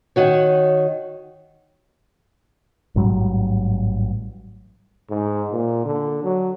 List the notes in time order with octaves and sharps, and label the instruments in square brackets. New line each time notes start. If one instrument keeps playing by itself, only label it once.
[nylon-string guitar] D#3 F#4 C#5
[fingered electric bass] A1 G#2 F#3 G3
[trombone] G#2
A#2
D3
F#3